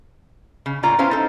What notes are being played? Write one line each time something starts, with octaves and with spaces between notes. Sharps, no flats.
C#3
A2 A#3 C#4 F4 D5 A#5
B3 C#4 E4 C5 F5 A#5
D#4 A4